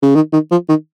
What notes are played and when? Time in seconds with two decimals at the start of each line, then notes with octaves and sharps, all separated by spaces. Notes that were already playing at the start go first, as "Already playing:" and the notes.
0.02 C#3
0.15 D#3
0.33 D#3
0.51 F3
0.69 D#3